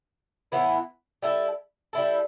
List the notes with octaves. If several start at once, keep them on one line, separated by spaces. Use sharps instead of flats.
A2 E3 B3 E4
G3 E4 A4
G3 E4 A4